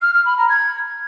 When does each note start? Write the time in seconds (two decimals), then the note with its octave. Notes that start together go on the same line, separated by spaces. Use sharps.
0.01 F6
0.13 F6
0.25 B5
0.37 A#5
0.49 G#6